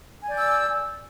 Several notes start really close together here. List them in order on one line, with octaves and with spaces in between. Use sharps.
G#5 D5 G6 E6